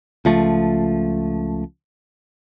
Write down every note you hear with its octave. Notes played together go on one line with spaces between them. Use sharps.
C#2 F3 A3